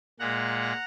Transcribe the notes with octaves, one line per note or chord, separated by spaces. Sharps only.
A#2 G#3 F#5 A#5